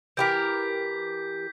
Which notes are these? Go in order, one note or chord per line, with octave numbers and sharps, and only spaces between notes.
E3 G4 A#4 G6 B6